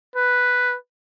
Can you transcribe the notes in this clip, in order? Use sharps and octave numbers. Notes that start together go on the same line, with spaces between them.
B4